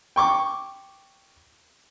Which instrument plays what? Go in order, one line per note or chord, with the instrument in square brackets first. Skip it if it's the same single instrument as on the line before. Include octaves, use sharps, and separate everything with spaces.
[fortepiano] G5 C#6 D6